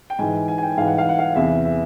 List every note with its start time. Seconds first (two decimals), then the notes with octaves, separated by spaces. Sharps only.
0.10 G5
0.19 G#2 E3 G#5
0.33 G#5
0.48 G#5
0.58 G#5
0.63 G5
0.77 G#2 E3 F5
0.87 F#5
0.98 F5
1.09 F#5
1.19 F5
1.36 E2 C3 E3 E5
1.65 E5